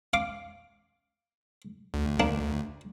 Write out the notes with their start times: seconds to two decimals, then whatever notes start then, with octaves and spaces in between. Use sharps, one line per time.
0.13 F5 D6
1.94 D2
2.20 A#3 D4